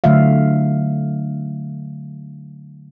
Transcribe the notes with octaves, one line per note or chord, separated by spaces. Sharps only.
D3 F#3 A3 E5 F5